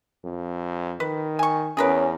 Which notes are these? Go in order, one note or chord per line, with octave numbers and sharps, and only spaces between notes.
F2
D#3 B4
G#5 C#6
E2 C#4 G#4 A#4 B4